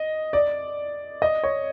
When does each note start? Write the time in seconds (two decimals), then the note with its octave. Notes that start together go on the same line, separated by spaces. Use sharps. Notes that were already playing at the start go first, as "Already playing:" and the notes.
Already playing: D#5
0.33 D5
1.22 D#5
1.44 C#5